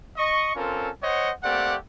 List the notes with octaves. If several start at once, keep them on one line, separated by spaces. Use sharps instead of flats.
D#5 C#6
C4 C#4 F4 A4 A#4
C5 C#5 D#5 F#5
A3 A#3 C4 G4 D5 F#5